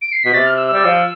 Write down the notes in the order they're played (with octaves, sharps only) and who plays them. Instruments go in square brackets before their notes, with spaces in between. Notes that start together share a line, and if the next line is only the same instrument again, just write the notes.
[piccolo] D7
C7
[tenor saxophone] B2 [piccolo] B6
[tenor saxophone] C3 [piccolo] A6
[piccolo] F6
E6
E6
[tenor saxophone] G3
F3